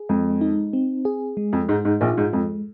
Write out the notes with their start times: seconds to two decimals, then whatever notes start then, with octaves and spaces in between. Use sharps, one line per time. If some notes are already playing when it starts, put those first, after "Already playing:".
Already playing: G#4
0.09 F2 G#3
0.41 D#4
0.73 C4
1.05 G#4
1.37 G#3
1.53 F2
1.69 G#2 D#4
1.85 G#2
2.01 A#1 A#2 F4
2.18 G#2
2.33 F2 G#3